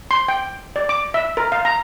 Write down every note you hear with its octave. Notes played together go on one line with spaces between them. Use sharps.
C6
G5
D5
D6
E5
A#4
F5
A#5